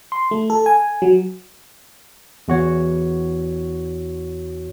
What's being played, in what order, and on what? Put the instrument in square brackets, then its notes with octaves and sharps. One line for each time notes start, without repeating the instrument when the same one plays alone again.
[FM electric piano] C6
A3
A4
G#5
F#3
[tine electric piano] E2 F#4 C#5